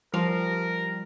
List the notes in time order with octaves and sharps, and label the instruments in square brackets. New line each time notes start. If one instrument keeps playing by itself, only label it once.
[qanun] F3 F5 [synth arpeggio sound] G3 [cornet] A#4